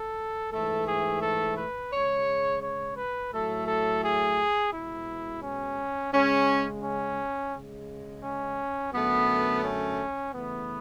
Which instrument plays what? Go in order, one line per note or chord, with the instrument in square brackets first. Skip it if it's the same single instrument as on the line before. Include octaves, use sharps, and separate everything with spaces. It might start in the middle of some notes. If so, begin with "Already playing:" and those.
Already playing: [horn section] A4
G#2 E3 A3 A4
G#4
A4
B4
C#3 G#3 C#5
C#5
B4
A2 F#3 A3 A4
A4
G#4
B2 G#3 E4
C#4
C#3 G#3 C#4
C#4
C#3 G#3
C#4
F#2 D3 A3 B3
C#4
C#3 E3 A3 B3